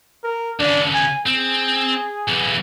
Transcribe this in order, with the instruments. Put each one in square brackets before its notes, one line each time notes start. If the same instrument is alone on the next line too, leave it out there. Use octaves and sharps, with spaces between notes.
[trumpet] A#4
[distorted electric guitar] D#2 C#3 [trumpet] D4
[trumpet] G#5
[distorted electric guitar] C4 [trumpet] G#4
[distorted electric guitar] B1 E3